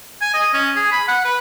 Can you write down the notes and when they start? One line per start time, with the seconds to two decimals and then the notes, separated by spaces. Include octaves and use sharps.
0.21 G#5
0.34 D#5
0.54 C#4
0.76 G#4
0.92 B5
1.08 F#5
1.25 B4